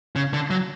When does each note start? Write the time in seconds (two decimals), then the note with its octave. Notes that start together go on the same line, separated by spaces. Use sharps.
0.16 C#3
0.34 D3
0.50 F#3